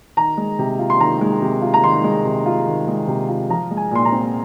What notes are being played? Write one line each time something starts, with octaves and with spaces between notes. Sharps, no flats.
D#3 A#5
G#3
C3
F4
C6
D#3 A#5
G#3
C3
F4
A#5
D#3 C6
G#3
C3
F4
D#3
G#3
C3
F4
F3 A#5
G#3
G#5
A#2 C6
A#5
C4